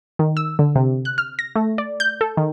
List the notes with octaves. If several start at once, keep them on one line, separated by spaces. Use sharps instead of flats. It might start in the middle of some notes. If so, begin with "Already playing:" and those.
D#3
E6
D3
C3
F#6
F6
A#6
A3
D5
G6
A4
D#3